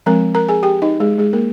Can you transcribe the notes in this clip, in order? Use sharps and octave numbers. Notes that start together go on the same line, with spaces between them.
F3 G#3 C4 A#4 A#5
A#4 A#5
G#4 G#5
G4 G5
D#4 D#5
G#3 G#4
G#3 G#4
A#3 A#4